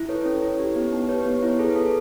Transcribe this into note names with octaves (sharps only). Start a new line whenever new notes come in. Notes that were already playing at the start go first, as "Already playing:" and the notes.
Already playing: E4
A4 B4 C#5
C#4
E4
G4
B3
D#4
G4 B4 C#5
B3
E4
G#4 A4 B4
B3 A4